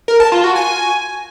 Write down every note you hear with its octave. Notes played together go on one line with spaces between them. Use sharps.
A#4
A5
F4
F#4
G#5